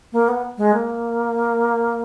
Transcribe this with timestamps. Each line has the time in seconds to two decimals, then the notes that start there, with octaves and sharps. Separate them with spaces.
0.12 A#3
0.28 B3
0.57 G#3
0.74 A#3